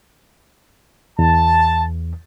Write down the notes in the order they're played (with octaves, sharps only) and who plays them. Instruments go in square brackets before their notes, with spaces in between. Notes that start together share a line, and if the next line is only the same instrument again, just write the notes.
[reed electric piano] E2 [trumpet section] A5